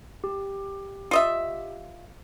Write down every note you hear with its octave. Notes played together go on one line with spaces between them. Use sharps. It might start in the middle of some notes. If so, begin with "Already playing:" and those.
G4
F4 D#5 E5